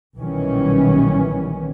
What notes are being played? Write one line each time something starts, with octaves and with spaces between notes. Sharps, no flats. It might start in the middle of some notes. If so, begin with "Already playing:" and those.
B1 A#2 D#3 E3 G3 C#4